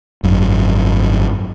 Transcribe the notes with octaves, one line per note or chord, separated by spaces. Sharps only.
G#1 F#2